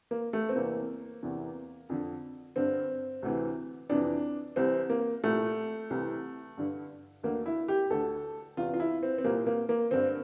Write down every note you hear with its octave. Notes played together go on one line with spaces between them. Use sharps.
A#3
A3
C4
E2 C3 E3 A#3
E2 C3 E3
F2 D3
G2 D3 C4
D2 C3 E3
F2 C3 E3 D4
C2 C3 E3 C4
A#3
C2 A#2 A3
C2 C3 E3
G2 D3
D2 D3 A#3
E4
G4
D2 D3 A4
E2 C3 E3 F4
F4
E4
C4
C4
C2 A#2 A#3
A#3
A#3
G2 D3 C4